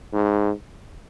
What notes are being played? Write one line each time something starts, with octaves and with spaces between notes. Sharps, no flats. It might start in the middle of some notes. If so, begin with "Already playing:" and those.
G#2